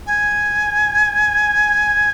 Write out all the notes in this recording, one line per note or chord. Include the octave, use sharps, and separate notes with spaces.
G#5